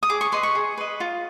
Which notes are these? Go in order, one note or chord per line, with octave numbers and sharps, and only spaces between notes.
D#6
G#4 D6
C#6
B4 D#5 C6
C#6
G#4
B4 D#5
F4